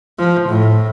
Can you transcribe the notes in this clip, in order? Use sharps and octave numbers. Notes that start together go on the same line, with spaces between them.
F3
A2